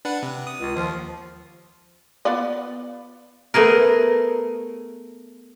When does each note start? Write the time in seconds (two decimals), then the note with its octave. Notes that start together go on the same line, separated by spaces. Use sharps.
0.05 D4 B4 F#5
0.23 C3
0.47 D#6
0.60 C#2
0.76 D#2 F3
2.25 B3 F4 D5
3.54 A3 B3 G#4 A#4